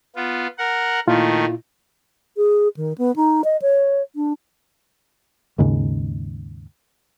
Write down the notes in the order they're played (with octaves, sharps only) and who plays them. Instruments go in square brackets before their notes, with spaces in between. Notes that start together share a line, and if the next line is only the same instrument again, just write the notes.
[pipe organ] B3 F4
A#4 F#5
[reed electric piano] A#2 E4 F4 [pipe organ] D#3 A3
[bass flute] G#4
D#3
B3
D#4
D#5
C#5
D4
[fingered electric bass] D#2 G#2 C#3